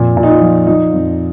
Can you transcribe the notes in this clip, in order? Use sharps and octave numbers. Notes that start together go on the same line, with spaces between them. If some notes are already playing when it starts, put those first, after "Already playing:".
Already playing: F2 A#2
A#2
D#4
F4
F3
F3 D#4
F2